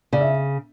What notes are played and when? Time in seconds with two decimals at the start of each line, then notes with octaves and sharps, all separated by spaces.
0.13 C#3 D5
0.21 E5